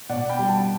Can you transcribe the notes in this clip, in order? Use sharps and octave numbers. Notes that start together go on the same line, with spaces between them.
B2 D5 F#5
G5 B5
G3
F#5 A5